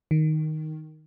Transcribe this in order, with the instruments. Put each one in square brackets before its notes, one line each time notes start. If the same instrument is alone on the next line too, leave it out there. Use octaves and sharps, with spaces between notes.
[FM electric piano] D#3